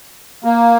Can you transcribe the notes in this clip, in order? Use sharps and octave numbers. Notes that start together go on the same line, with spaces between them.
A#3